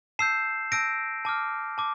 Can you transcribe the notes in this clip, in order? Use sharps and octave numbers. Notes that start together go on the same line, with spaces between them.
A5 E6 G6 C7 E7
A5 E6 G6 A#6 D7
A5 D6 F6
A5 D6